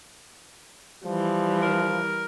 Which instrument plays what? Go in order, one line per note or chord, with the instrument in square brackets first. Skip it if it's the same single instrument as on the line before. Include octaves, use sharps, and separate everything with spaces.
[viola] E3 G3 [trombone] F3
[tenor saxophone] A#4